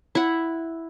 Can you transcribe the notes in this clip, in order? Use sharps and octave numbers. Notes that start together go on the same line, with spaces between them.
E4 F#5